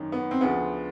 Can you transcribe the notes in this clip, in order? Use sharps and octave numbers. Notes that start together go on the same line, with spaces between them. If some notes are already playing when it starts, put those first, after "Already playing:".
Already playing: G#1 F#2 D#3
B3
C4
D2 C#3 F3 B3